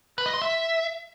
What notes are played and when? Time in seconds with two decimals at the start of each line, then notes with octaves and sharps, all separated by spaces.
0.18 B4
0.26 D#5
0.34 C6
0.42 E5